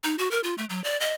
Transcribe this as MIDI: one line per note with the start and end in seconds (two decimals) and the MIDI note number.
0.04 0.15 63
0.18 0.30 66
0.31 0.40 70
0.44 0.55 65
0.58 0.65 57
0.70 0.82 54
0.84 0.99 74
1.00 1.14 75